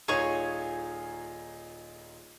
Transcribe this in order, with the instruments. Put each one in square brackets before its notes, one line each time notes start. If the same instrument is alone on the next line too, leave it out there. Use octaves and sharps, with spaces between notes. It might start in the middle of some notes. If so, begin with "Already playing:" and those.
[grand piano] D#1 D#4 F4 [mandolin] G#4 C#5